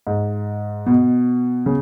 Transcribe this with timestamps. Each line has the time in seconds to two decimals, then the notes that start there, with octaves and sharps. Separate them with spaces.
0.07 G#2
0.86 B2
1.66 C#3